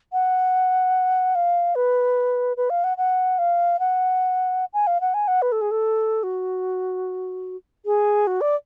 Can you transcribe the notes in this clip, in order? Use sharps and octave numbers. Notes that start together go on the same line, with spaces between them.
F#5
F5
B4
B4
F5
F#5
F#5
F5
F#5
G#5
F5
F#5
G#5
F#5
B4
A4
G#4
A4
F#4
G#4
F#4
D5